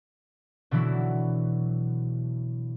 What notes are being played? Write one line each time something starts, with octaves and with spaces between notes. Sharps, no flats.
B2 D3 E3 F#3 E4